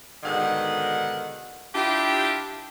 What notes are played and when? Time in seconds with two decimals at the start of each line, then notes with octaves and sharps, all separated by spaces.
0.24 G#2 B2 D3 D#3 F#5
1.75 D4 E4 F4 G4